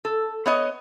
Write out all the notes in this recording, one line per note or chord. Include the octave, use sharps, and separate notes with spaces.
A4
B3 C#5 D#5